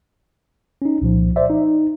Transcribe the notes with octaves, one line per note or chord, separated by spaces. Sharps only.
C#4 D#4
C2 A#2 F3
C5 D5 E5
D#4